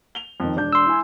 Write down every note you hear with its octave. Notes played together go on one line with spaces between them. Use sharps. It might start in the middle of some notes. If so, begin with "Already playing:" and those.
F7 G7
F2 D#3
E1 D4 G6
C6 E6
E4 G#5